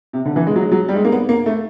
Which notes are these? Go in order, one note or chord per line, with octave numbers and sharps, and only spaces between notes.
C3
D3
E3
G#3
F#3
G#3
F#3
G3
G#3
A#3
B3
A#3
A3